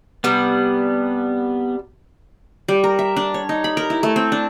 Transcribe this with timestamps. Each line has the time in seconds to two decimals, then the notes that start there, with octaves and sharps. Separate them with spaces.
0.24 C3 G3 B3 D4
2.68 G3
2.84 A#4
2.99 E5
3.16 D4
3.34 C#5
3.49 D#4
3.64 B5
3.77 A#4
3.90 E4
4.03 A3
4.16 C4
4.32 D4